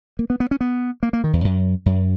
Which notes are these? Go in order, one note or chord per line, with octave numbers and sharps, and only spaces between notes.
A#3
B3
B3
C#4
B3
A#3
A#3
D#3
E2
F#2
F#2